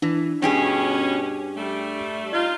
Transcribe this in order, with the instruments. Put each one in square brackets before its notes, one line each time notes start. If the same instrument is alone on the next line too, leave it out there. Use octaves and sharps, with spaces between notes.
[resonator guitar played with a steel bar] E3 [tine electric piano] D4
[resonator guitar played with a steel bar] G2 G4 G#4 [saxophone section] B2 C#4
[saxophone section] G3 A3
D#4 F4